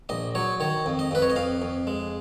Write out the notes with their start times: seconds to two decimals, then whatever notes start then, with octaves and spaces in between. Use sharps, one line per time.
0.09 A#1 D#5
0.35 F#3 C#5
0.60 D#3 C#5
0.86 F2
0.99 D#5
1.11 F2 B4
1.22 C#5
1.30 D#5
1.36 F2 F5
1.62 F2
1.87 G#3